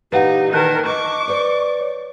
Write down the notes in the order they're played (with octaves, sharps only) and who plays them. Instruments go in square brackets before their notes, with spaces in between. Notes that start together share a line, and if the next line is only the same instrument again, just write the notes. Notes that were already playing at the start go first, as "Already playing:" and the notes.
[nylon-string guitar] A#2 E3 [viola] D#4 [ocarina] G4 [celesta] B4 F5 F#5
[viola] D#3 A#4 [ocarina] B4 [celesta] A5 F#6 G6
[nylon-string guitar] D4 [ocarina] D#5 [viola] C#6 D6
[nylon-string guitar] B4 C5 [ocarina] D5
[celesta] C#5